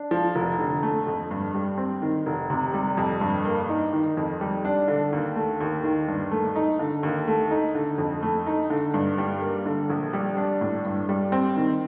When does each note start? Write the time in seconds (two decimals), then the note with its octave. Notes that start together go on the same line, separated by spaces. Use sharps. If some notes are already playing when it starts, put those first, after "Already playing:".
Already playing: D4
0.11 F3
0.35 F1
0.59 D3
0.83 A3
1.07 F2
1.31 G2
1.55 G3
1.78 C4
2.02 D#3
2.26 F1
2.50 C3
2.74 G3
2.97 F2
3.21 G2
3.45 A#3
3.69 D#4
3.93 D#3
4.17 F2
4.41 G3
4.65 D4
4.88 D3
5.12 D#2
5.36 A3
5.60 D#2
5.83 D#3
6.08 G2
6.31 A3
6.56 D#4
6.79 D3
7.03 D#2
7.28 A3
7.51 D#4
7.75 D3
7.98 F2
8.22 A3
8.47 D#4
8.70 D3
8.94 G2
9.18 G3
9.42 A#3
9.66 D3
9.90 A#1
10.13 G3
10.37 D4
10.61 A2
10.85 G2
11.09 G3
11.32 C4
11.56 D#3